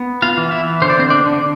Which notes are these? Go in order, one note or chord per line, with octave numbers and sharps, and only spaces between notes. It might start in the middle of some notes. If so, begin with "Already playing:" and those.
Already playing: B3
F4 F5
E3
E4 E5
D3 C5
D5
C4 C5
D4 D5
D3